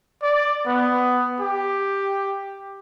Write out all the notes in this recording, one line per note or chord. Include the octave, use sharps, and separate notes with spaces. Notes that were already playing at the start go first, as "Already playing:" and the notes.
D5
B3
G4